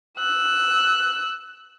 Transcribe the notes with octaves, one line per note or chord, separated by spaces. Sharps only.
E6 F#6